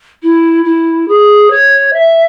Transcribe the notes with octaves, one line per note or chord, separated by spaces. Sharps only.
E4
E4
G#4
C#5
E5